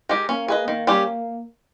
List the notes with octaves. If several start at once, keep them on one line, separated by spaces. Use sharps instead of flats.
G#3 D#4 G4 A#4
A#3 C#4
G#4 B4 D#5
D#3 A#3
G3 C#4 G4